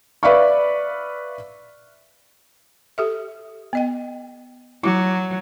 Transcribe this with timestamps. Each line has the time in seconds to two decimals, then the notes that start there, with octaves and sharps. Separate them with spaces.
0.23 B4 D5 E5 F5 C#6
2.98 G4 A4 E5
3.73 B3 D#5 G5
4.84 F#3 E4 D6